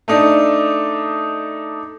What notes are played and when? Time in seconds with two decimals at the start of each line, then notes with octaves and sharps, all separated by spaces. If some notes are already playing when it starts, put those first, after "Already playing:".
0.08 A3 D4 D#4 A4